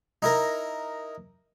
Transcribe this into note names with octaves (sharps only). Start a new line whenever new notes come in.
D#4 E4 A#4